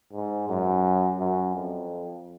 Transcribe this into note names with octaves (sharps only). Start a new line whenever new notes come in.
G#2
F#2
F#2
F2